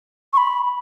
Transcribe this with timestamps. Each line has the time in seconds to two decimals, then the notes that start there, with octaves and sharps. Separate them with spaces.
0.33 C#6
0.37 B5